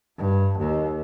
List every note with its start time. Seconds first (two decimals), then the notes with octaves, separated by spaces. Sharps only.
0.18 G2
0.59 D#2